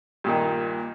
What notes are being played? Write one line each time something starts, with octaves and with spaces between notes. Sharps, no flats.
G2 A#2 D#3